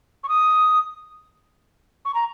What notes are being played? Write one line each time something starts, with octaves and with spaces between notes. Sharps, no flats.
C#6
D#6
C#6
A#5